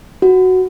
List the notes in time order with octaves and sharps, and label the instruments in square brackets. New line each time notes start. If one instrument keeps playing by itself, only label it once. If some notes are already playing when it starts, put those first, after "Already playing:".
[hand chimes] F#4